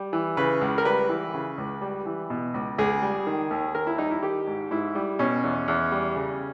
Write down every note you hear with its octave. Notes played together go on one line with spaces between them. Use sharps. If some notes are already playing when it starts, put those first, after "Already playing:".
Already playing: G3
E3
C#3 B4
C#2
A#4
G3 B4
E3
C#3
C#2
G3
E3
B2
C#2
C#2 G#4
G3
D#3
D#2
D#2 A#4
E4
G3 D#4
E4
D#3 G4
G#2
G#2 E4
G3
B2 C#4
E2
E2
G3
C#3